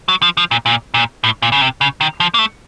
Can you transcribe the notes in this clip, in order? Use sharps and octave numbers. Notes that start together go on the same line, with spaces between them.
F#3
F3
F3
A#2
A#2
A#2
A2
A#2
C#3
C3
C#3
D#3
F3
A#3
A3